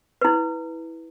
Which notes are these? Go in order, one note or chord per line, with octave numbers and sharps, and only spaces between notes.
E4 B4